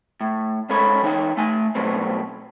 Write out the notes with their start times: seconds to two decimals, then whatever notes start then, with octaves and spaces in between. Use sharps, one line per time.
0.21 A2
0.69 G#2 C#4 A4 C#5 B5
1.03 E3 D#4 C#5 G5
1.37 A3 G#5
1.75 B2 F#3 G3 A3 C4